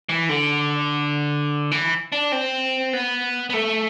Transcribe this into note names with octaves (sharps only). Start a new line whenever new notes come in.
E3
D3
E3
D4
C4
B3
B3
A3